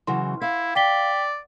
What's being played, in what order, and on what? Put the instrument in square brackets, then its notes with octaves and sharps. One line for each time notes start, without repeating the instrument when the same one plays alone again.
[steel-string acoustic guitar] C#3 E3 F#3 [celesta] C6
[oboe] E4 [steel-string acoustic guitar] F5
[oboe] D5 [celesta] G5 B6 G7